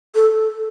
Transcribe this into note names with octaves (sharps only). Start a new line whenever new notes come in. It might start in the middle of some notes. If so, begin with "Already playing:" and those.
A4